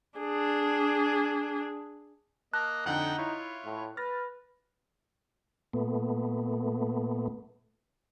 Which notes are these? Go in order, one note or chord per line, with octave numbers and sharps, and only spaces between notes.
D4 G#4
A#3 D#5 A5 F#6
F2 D3 D#4 F#5 G5
E4 F4 C#5
A2
B4 F6 A6 A#6
A#2 A3 B3